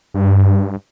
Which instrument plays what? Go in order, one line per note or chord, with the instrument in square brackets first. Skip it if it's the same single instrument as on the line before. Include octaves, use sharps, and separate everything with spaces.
[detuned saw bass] G2